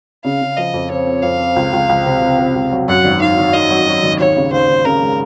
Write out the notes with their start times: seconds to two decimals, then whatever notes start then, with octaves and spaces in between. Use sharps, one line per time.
0.24 C#3 F5
0.41 C#3
0.57 F3 D#5
0.74 F2
0.90 C4 C#5
1.07 C4
1.23 F2 F5
1.40 C4
1.56 C#2
1.73 C#2
1.89 C#2
2.06 C3
2.22 C3
2.39 C3
2.56 C#2
2.72 F#3
2.88 F#2 F#5
3.04 G#1
3.21 D#3 F5
3.38 D#3
3.54 D#3 D#5
3.71 F#3
3.87 F#3
4.03 G#1
4.19 D#2 C#5
4.36 C#3
4.52 D#2 C5
4.69 D#2
4.85 C#3 A#4
5.02 G#3